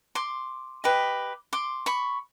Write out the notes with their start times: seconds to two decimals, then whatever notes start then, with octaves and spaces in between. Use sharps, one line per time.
0.15 C6 D6
0.84 G4 B4 D#5
1.53 C6 D6
1.86 B5 C#6